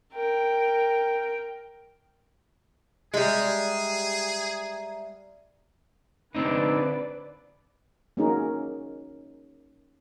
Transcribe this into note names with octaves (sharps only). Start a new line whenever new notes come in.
A#4 G5
G3 G#3 G#4 D5 E5 A#5
D3 C4 D#4 B4 D5
A#3 C#4 D#4 F#4 G#4 A#4